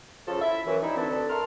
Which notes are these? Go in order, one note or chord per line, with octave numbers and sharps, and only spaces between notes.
C#3 F3 A4
E4 E5
F#2 E3
G3 D#4 E4
D2 D3 C4 A4 B4
A4 A#4 C6 F6